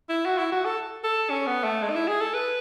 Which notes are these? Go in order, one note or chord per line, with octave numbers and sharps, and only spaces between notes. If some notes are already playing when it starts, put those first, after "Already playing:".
E4
F#4
E4
F#4
A4
A4
C#4
B3
A3
G#3
D#4
E4
G#4
A4
B4